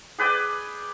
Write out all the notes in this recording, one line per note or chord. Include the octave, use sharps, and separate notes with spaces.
G#4 B4 D5 G5